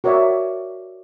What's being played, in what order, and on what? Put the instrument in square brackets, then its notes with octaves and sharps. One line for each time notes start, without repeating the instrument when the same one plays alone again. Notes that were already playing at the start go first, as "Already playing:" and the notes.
[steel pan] F#4 A#4 C#5 D5 E5